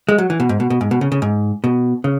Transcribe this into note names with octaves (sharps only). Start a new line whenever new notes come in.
G#3
F#3
E3
B2
G#2
B2
B2
G#2
B2
C#3
C#3
G#2
B2
C#3